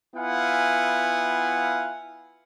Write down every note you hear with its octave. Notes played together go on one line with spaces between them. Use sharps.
B3 E4 F4 F5 F#5 G#5